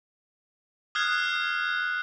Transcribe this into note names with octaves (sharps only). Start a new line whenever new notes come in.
D#6 F6 F#6 G#6 C7